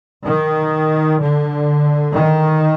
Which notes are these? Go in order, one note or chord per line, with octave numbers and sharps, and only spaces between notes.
D#3
D3
D#3